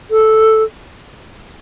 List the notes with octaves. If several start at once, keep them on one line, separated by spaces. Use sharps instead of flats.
A4